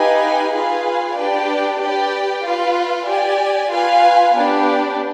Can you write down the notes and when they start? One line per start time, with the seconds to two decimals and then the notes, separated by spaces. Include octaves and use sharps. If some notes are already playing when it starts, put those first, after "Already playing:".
Already playing: D#4 G4 B4 F5 G#5
0.52 F4 G#4 B4 F5 G#5
1.15 D4 G4 B4 D5 G5
1.80 G4 B4 D5 G5
2.43 F4 B4 F5
3.07 G4 D5 G#5
3.71 F4 B4 F5 G#5
4.35 B3 D4 G4